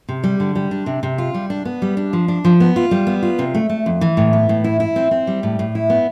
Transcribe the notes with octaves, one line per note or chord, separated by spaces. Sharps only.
C3
G3
D3
G3
D4
C3
C3
F4
G3
D4
B3
G3
D4
F3
D4
F3
B3
F4
G3
B3
F4
C3
A3
A3
F2
E3
A2
B3
A2
E4
E4
C4
C4
G3
A2
A2
E4
B3